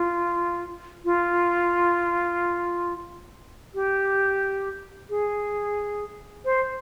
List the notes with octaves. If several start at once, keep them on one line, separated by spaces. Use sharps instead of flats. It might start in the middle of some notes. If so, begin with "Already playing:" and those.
Already playing: F4
F4
G4
G#4
C5